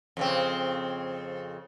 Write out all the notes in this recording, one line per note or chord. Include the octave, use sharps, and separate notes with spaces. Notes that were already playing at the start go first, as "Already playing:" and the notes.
F2 C#3 C4